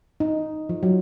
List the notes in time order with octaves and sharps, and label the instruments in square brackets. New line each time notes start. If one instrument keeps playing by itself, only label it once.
[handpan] D#4
F3
F#3